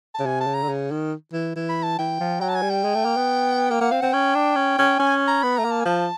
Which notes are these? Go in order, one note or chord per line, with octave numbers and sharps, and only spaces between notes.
A5
C#3
C3 G#5
A5
C#3
A#5
D3
C#3
D#3
E3
E3
B5
A5
E3 G5
F3
F#3 G5
A5
G#5
G3
G5
G#3
A3
A#3
B3
A#3 G5
A#3 F#5
C4 F5
C4 F#5
C#4 G5
D4
C#4
C#4
C#4 G#5
A#5
B3 B5
A3 A#5
A#3
A5
G#5
F3 A5